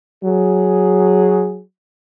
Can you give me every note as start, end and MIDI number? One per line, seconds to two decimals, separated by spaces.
0.23 1.61 54
0.23 1.61 68